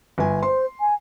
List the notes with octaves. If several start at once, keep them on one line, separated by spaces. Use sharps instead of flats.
G1 G#5
C5 C6
G#5